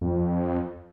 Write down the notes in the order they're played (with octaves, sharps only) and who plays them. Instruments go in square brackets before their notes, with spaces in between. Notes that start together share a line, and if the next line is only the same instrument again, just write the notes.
[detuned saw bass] F2